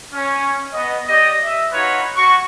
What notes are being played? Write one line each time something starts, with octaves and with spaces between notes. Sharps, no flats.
C#4
B3 D#5
G4 D5 D#5
E5
D#4 F4 F#4 B4 C#5
F#4 C#6